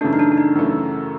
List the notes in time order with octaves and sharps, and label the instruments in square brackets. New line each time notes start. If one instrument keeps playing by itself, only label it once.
[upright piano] F#2 C#3 E3 A3 [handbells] D4
[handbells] D#4
D4
D4
D#4
[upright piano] F#2 C#3 E3 A3